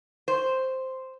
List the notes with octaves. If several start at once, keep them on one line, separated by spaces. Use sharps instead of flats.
C5